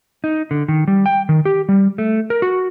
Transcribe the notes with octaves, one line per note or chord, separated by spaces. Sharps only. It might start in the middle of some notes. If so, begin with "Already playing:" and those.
D#4
D3
D#3
G3
G5
D#3
G4
G3
A3
A#4
F#4